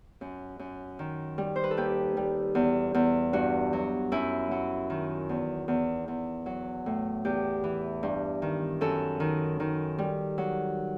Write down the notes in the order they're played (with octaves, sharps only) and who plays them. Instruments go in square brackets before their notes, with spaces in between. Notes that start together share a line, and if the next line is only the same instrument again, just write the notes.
[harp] F#2
F#2
D#3
G3
C5
B4
A4
D#2 G4
G3
E2
E2
G2 F#4
F#3
F#2 E4
F#3
D#3
E2
E2
E2
F#3
A2
E2 G4
E3
G2
D#3
F#2 A4
D#3
D#3
G3
F#3